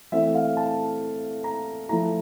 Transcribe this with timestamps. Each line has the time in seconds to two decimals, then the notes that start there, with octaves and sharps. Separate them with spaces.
0.12 E3 A3 C4 E4 E5
0.35 F5
0.57 A5
1.44 A#5
1.89 F3 A3 E4 A#5